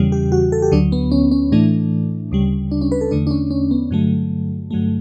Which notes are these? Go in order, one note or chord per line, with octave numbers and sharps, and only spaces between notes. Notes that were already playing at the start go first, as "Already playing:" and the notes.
Already playing: E2 C#3 E3 G3
G4
F#4
A4
G4
D2 D3 F#3 D4
B3
C#4
C#4
A2 E3 A3 D4
D2 C#3 G3
D4
C#4
B4
A4
E2 D3 A3 D4
D4
C#4
C#4
B3
G2 D3 F#3 A3
G2 D3 F#3 A3